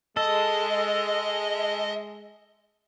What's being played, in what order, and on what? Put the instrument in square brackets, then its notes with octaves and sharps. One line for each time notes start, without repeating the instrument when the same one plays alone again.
[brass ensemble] G#3 [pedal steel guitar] A4 [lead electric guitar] D#5